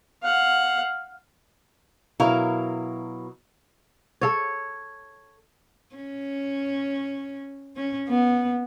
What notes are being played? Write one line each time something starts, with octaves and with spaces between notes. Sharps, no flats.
F5 F#5
B2 F#3 E4 A#4 F5
A4 C#5
C#4
C#4
B3